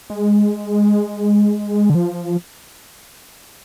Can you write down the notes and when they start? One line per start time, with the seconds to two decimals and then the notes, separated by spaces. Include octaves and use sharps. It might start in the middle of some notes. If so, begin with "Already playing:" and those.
0.10 G#3
1.90 D3
1.95 F3